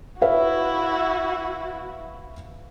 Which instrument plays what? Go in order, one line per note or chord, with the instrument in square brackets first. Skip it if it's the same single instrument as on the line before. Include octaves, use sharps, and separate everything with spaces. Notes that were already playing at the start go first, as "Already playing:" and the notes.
[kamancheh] E4 F#4 [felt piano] B4 E5 F5